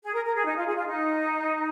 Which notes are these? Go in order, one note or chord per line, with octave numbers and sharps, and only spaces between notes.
G#4
A#4
A#4
G#4
D#4
F4
G#4
F4
D#4